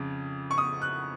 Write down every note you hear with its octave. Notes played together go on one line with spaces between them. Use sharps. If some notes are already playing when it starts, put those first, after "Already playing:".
Already playing: F2 C#3
C#6
D#6
F#6